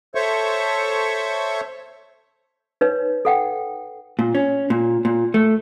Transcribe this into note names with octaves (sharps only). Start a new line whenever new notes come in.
A4 C5 C#5 E5 C#6
D#4 B4 C#5
A4 F#5 G5
A#2
C#4
A#2
A#2
A3